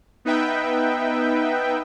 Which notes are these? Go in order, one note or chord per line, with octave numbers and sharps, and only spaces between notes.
B3 D#4 B4 E5 G5